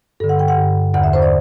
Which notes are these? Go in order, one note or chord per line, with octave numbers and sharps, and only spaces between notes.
G2 D3 A4
F#5
G5
F#5
G2 D3
E2 D3 F#5
E5
C5
D5